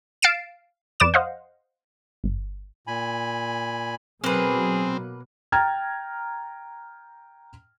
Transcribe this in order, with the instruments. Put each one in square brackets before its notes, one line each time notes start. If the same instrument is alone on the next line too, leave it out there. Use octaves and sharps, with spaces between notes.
[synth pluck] F5 A6 C7 D7 E7
F2 B4 D5 D6 E7
C5 D#5 F5 F#5
G1
[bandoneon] A#2 G#5 B5
[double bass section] B2 F#3 [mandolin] A#3 B4 [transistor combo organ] C4 [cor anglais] G#4
[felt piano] G5 A#5 F6 G#6 A6